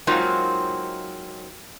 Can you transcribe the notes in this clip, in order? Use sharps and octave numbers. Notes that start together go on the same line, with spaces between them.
F#3 G#3 A#3 C4 D#4 F4